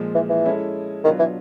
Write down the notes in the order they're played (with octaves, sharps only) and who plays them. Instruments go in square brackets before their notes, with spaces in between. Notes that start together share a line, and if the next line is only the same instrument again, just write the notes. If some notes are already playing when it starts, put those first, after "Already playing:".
Already playing: [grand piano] A#2 F3 G#3
[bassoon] E3
E3
[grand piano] G#3 C#4 E4 A4
[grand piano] B2 F#3 B3 D4 F4 [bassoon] D#3
[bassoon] E3